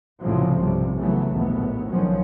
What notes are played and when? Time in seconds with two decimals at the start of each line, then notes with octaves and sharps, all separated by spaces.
0.21 C2 F2 A2 C#3 F3 F#3
0.60 B1 G2 C3 G3
0.98 C#3 E3 F#3 A3 B3
1.29 A#1 D#2 A2 B3
1.89 B1 D#3 F3 F#3 C#4